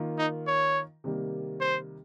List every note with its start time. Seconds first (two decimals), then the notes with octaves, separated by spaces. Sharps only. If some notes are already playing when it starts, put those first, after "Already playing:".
Already playing: D#3 A#3 F4 A#4
0.18 D#4
0.47 C#5
1.04 C3 D#3 G3 A#3
1.61 C5